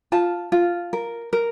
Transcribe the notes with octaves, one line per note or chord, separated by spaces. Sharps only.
F4 A5
F4
A#4
A#4